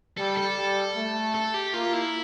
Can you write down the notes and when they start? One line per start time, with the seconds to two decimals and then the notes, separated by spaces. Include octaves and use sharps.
0.17 G3 A4
0.37 A4
0.57 G3
0.96 A3
1.35 A4
1.54 G4
1.74 A#3 F4
1.93 E4